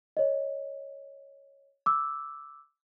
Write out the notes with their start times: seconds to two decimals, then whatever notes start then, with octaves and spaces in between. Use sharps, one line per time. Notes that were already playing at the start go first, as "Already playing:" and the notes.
0.17 C#5 D#5
1.86 D6 E6